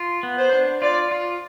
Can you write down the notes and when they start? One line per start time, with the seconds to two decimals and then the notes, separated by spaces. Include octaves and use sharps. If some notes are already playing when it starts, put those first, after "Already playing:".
Already playing: F4
0.23 B3
0.38 C5
0.53 D4
0.81 F4 D5
1.11 F4